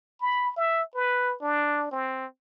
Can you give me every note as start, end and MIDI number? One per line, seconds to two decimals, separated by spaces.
0.21 0.52 83
0.56 0.83 76
0.95 1.36 71
1.42 1.88 62
1.92 2.26 60